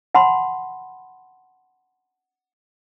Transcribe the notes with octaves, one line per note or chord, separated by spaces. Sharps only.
F#5 A5 B5 C6